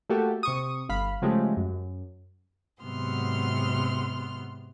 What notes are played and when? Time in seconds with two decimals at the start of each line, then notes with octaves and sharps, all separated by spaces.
0.09 A3 A#3 F#4 G4 A4
0.43 C3 C#6 D#6
0.89 G1 F5 B5
1.22 C#3 F3 G#3 A3 G4
1.57 F#2
2.82 G#2 C3 F#3 B3 C6 F6